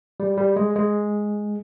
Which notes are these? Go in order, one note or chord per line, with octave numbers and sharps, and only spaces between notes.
G3
G3
G#3
G#3